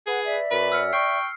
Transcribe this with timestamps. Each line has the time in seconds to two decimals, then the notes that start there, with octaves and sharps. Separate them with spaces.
0.07 G#4 B4 F#5
0.25 D5 E5
0.51 F#2 B4
0.72 E6 F6 C#7
0.93 G5 C#6 C7